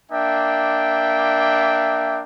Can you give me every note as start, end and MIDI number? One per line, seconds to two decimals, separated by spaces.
0.11 2.23 58
0.11 2.23 62
0.11 2.23 76
0.11 2.23 79